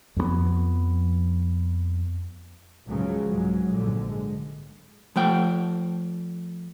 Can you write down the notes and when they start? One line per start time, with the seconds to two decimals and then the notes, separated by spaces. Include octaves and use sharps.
0.16 F2 F3 G3 B3
2.87 C#2 G#2 C#3 F3 F#3 G#3
3.28 C2 G#2 C#3 F#3 G#3
3.69 A#1 G#2 D3
4.03 G#3
5.16 F3 A3 G5